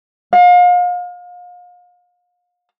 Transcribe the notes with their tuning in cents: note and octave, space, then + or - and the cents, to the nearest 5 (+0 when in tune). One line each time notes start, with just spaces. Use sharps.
F5 +35